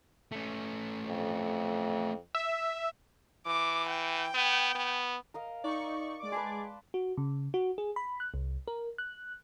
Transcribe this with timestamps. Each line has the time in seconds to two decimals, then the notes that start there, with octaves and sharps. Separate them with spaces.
0.32 A3 C#4
1.06 F2
2.35 E5
3.47 E3 D6
3.90 G5
4.34 B3
4.75 B3
5.34 A#4 D#5 F5
5.64 D#4 D5 C#6
6.19 G#3 D5 D6
6.32 G#4 B4 A5 C6
6.94 F#4
7.17 C#3
7.54 F#4
7.78 G#4
7.96 B5
8.20 F#6
8.34 C2
8.68 A#4
8.98 F#6